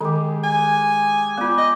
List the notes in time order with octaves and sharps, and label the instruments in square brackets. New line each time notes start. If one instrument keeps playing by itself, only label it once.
[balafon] D#3 [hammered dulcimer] G#3 G4
[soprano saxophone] G#5
[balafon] B3 F4 [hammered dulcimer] D5 G5
[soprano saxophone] D#5